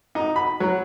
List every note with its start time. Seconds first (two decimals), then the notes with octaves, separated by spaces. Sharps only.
0.15 D#4
0.36 B5
0.60 F#3